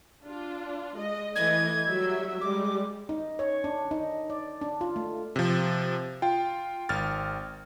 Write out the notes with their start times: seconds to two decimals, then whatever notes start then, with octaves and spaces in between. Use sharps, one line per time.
0.24 D4 F4
0.97 G#3 D#5
1.36 E3 A3 D#5 G#6
1.88 F#3 G3 E5
2.41 G3 G#3 D6
3.09 D#4
3.39 C#5
3.64 D4
3.91 D#4
4.30 D5
4.61 D4
4.81 F4
4.96 A3
5.36 C3 F3
6.22 F4 G5
6.89 G#1 F6 A6